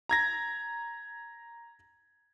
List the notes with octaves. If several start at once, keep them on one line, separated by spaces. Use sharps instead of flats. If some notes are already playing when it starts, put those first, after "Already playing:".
A#5 G#6 A#6